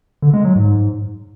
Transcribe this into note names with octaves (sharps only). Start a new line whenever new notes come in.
D3
G#3
F#3
G#2